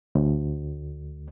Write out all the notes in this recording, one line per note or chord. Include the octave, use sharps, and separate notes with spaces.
D2